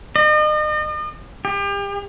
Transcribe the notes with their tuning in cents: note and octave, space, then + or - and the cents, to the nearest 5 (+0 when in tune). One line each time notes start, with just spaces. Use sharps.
D#5 -40
G4 +35